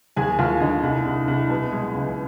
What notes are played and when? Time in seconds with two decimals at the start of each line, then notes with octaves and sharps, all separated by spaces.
0.16 D#2 G#4 G#5
0.39 D#2 F4 F5
0.61 D3 D#4 D#5
0.83 C2
1.05 C2
1.28 C2
1.50 B2
1.73 G#3
1.95 C#2